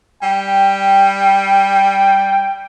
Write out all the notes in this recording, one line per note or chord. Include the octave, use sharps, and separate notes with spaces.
G3 G5